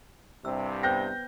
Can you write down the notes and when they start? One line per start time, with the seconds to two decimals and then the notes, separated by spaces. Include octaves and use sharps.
0.45 C2 G2 C3 E6
0.83 B3 C5 G5 G6 A#6